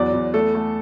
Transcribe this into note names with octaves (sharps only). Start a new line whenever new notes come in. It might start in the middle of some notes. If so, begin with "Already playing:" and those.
Already playing: E2 F#3 D5
E2
A3 A4
A3